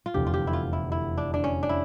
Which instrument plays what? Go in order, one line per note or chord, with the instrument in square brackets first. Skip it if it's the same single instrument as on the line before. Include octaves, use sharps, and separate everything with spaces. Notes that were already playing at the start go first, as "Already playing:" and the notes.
[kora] F4
[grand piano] F1 E2 D3 F3 [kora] G4
[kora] F4
G4
E4
F4
E4
E4
D4
D4
C#4
D4
E4